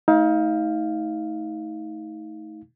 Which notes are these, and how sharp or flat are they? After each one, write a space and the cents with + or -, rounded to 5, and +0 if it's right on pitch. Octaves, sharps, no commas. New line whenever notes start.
A3 -5 D#4 +35 F5 +0